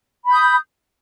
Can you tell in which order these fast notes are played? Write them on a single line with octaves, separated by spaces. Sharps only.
B5 G6 D#6